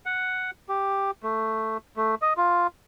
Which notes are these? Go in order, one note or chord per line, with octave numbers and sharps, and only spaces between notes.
F#5
G4
A3
A3
D#5
F4